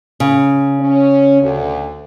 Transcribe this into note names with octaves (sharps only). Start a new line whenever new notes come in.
C#3
C#4
D2